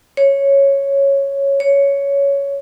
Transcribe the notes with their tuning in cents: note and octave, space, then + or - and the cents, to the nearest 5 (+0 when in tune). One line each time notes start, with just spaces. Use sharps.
C#5 -5
C#5 +10